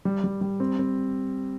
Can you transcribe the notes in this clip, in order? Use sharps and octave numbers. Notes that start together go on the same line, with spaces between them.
G3
G3
G3
C4
C4